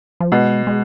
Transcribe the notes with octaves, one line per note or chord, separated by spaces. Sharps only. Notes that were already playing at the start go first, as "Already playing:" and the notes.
F3
B2 G#3
G#3